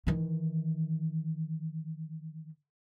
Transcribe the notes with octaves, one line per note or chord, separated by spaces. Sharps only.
D#3 E3